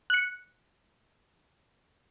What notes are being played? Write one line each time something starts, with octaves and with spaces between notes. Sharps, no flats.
F#6 C#7